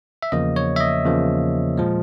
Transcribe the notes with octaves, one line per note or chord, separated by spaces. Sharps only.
E5
E2 C#3 F3 A#3 D#5
C#5
E5
D#5
E2 C#3 F3 A#3
A#2 F3 G#3